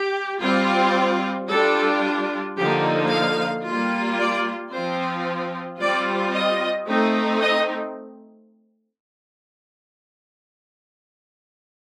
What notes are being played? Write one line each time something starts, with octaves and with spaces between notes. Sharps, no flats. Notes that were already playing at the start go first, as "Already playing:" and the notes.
Already playing: G4
G3 C4 F4
G3 D4 F4 A4
D3 F3 A#3 D#4 G4
F5
G3 A#3 F4
D5
F3 C4 F4 C5
G3 C4 F4 D5
D#5
A3 C4 D#4
D#5